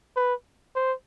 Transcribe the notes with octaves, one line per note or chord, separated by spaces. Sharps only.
B4
C5